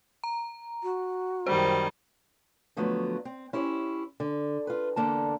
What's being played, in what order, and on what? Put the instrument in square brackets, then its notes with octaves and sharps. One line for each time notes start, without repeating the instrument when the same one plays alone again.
[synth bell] A#5
[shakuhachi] F#4
[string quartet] F#2 D#3 G3 [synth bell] C5
[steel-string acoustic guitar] D3 F3 F#3 A3 B3
C4
C#4 E4 G4 C5
D3
F4 B4
E2 D3 A#3 A5